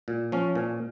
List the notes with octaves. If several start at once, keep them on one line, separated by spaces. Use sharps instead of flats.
A#2
F3 C#4
A#2